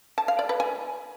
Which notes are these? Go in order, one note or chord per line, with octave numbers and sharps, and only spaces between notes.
A5
F5
D5
B4
G#5